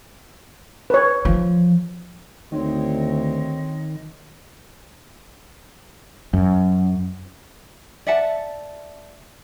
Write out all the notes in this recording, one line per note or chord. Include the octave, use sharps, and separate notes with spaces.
B4 C#5
F3
D2 D#3 C4 C#5 D#5
F#2
D5 E5 F#5 A5